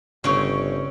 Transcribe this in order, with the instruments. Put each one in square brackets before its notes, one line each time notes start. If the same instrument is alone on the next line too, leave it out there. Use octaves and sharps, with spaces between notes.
[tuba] G1 [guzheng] C#3 G5 [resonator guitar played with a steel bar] C4 C#5